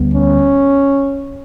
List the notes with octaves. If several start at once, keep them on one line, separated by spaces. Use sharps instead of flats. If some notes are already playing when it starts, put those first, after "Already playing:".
Already playing: D2 D3 G3 B3
C#4